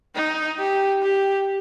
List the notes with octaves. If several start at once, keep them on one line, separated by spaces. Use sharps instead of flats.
D#4
G4
G4